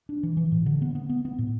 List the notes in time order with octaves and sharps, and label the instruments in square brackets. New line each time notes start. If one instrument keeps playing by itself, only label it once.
[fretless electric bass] D4
E3
E3
A2
D3
B3
B3
B3
B3
A2